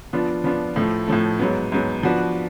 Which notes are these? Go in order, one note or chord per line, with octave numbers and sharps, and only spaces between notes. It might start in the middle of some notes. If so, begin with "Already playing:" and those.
F3 B3 D4 F4
F3 B3 D4 F4
A2 F3 A3
A2 F3 A3
G#2 F#3 B3
G#2 F#3 B3
F3 B3 D4 F#4 B4